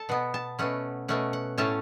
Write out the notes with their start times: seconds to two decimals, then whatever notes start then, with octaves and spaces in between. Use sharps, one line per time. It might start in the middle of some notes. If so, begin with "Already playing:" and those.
Already playing: A4 A5
0.09 B2 B3 F#5
0.34 A5
0.59 B2 A3 C#4 F#5
1.08 B2 A3 C#4 F#5
1.33 F#5
1.58 A2 A3 C#4 A5